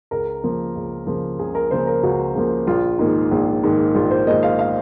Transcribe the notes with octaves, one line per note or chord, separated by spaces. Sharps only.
C#2 A#4
C#3 F3 A#3
C#2
C#3 F3 A#3
C#2 G#4
A#4
C#3 F3 A#3 C5
A#4
C#2 F#4
C#3 F3 A#3
A#1 F4
G#2 D#3 A#3
A#1
G#2 D#3 A#3
A#1 F4
C5
G#2 D#3 A#3 D#5
F5
F5